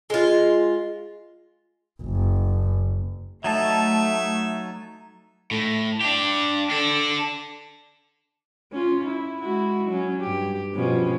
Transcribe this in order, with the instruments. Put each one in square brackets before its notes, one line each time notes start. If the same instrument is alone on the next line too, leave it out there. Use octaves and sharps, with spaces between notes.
[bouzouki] G#3 F4
[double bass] F#1
[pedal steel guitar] F#3 D#4 A5 [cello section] A3 [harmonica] E5
[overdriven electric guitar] A2
D4 G4
D4 A4
[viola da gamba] C#4 F4
E4
G#3 E4 F#4
F#3 C#4
G2 G4
B2 F3 C#4